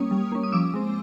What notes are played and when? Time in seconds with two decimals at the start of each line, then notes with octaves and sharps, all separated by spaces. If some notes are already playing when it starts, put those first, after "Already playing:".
Already playing: G3 A#3 C#4 C#6 D#6
0.11 G3
0.32 A#3 C#4
0.43 D#6
0.52 F3 D6 E6
0.74 G#3 C4